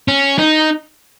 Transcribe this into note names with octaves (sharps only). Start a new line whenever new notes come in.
C#4
D#4